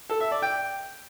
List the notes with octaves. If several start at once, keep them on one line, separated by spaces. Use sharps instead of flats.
A4
E5
D5
G5